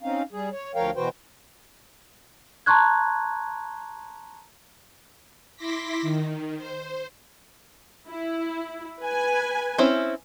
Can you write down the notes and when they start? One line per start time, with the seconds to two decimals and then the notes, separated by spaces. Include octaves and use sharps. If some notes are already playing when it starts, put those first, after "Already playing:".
0.03 C4 C#4 D#4 F5
0.32 G3 G#4
0.52 C#5
0.75 D2 F3 A#4 C#5 F5 G5
0.96 B2 E3 F#4 B4 C5 G5
2.66 A5 A#5 C6 C#6 F#6 G#6
5.56 E4 C6 D6 A#6 B6
6.02 D#3
6.57 C5
8.09 E4
9.01 B4 G#5
9.78 C4 C#4 E4